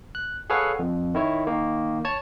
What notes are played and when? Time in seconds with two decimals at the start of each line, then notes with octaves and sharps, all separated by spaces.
0.15 F#6
0.50 G#4 A4 B4 C#5 F5 F#5
0.79 F2
1.14 D#3 E4 C#5
1.47 D#3 A#3
2.05 C#5 A5 G#6